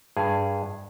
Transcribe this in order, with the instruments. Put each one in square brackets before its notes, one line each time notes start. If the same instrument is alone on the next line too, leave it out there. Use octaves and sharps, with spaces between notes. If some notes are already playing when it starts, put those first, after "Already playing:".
[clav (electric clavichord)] G2 G#4